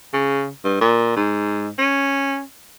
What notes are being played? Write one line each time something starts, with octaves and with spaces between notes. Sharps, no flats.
C#3
G2
A#2
G#2
C#4